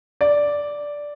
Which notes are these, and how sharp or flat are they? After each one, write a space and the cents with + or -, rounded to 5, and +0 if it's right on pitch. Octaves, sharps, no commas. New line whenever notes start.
D5 -5